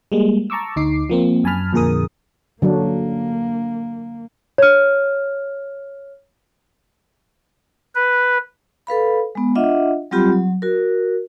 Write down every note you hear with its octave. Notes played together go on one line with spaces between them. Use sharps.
G3 G#3 A#3
A5 A#5 C#6 D6 E6
D2 D#4 D6 C7
F3 A#3 C4
F#2 G#5 A5 B5 F6
F2 A#2 D3 G#4 A#4 D#6
D3 F#3 A#3 D4
C#5 F6
B4
A4 B4 F5 B5
G#3 B3
D4 F4 D#5 E5 F#5
F#3 G3 C4 F4 G4 B5
F#3
F#4 A#4